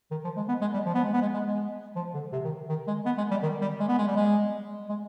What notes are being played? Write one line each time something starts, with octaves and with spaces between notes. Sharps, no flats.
D#3
F3
G#3
B3
G#3
G3
F3
B3
G#3
B3
G#3
G#3
G#3
F3
D3
C3
D#3
D#3
G#3
B3
G#3
G3
D#3
G3
G#3
B3
G#3
G3
G#3
G#3